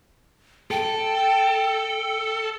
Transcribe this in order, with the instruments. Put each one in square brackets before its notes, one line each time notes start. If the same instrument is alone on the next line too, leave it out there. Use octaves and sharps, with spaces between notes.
[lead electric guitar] A4 [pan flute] G5